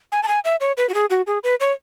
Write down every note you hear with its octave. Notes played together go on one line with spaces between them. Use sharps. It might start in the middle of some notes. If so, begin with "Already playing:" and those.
G#5
A5
G#5
E5
C#5
B4
F#4
G#4
F#4
G#4
B4
C#5